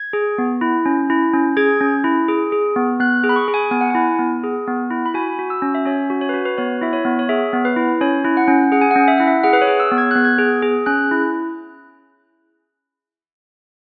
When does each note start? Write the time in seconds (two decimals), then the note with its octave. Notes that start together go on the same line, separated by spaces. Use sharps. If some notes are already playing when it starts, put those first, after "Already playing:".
Already playing: G#6
0.13 G#4
0.38 B3
0.61 E4
0.86 C#4
1.10 E4
1.34 C#4
1.57 G#4 G#6
1.81 C#4
2.04 E4
2.29 G#4
2.52 G#4
2.76 B3
3.00 B3 F#6
3.24 G#4
3.29 B5
3.36 C#6
3.48 G#4
3.54 G#5
3.71 B3 G#5
3.81 F#5
3.90 E4 G#5
4.19 B3
4.44 G#4
4.67 B3
4.91 E4
5.06 B5
5.14 F#4 G#5
5.39 F#4
5.50 E6
5.62 C#4
5.75 E5
5.85 C#4 C#5
6.10 F#4
6.21 C#5
6.29 B4
6.34 F#4
6.45 B4
6.58 B3 C#5
6.81 E4 E5
6.93 C#5
7.05 B3
7.19 C#5
7.29 G#4 E5
7.53 B3
7.65 B4
7.76 E4
8.01 C#4 C#5
8.25 E4
8.37 F#5
8.48 C#4
8.72 G#4 F#5
8.81 G#5
8.91 F#5
8.96 C#4
9.08 E5
9.17 E4 F#5
9.27 E5
9.43 G#4 F#5
9.53 B4
9.62 C#5
9.68 G#4
9.80 E6
9.91 B3
9.98 G#6
10.11 B3 F#6
10.25 G#6
10.38 G#4
10.63 G#4
10.86 C#4 F#6
11.11 E4